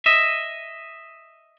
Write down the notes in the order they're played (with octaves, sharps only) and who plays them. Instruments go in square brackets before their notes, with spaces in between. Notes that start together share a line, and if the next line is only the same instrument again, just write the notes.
[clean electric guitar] D#5 E5